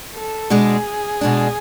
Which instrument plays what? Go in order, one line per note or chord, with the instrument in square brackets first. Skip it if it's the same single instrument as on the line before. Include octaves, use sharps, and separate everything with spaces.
[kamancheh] A4
[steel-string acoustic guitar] B2 G#3 D4 [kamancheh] G#4
[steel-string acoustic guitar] B2 G#3 D4